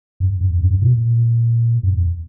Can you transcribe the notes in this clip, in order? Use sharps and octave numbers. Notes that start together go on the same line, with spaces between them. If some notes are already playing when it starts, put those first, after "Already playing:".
F#2
F#2
E2
F#2
F#2
B2
A#2
F#2
E2